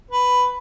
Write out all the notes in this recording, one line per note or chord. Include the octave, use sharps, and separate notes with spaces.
B4